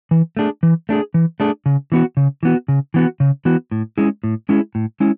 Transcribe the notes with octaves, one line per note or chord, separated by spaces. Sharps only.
E3
A3 D4 G#4
E3
A3 D4 G#4
E3
A3 D4 G#4
C#3
E3 B3 F#4
C#3
E3 B3 F#4
C#3
E3 B3 F#4
C#3
E3 B3 F#4
A2
G#3 C#4 E4 G#4
A2
G#3 C#4 E4 G#4
A2
G#3 C#4 E4